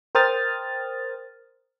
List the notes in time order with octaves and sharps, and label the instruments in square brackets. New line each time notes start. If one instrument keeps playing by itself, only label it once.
[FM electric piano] A#4 C5 G5 D#6 F6 A6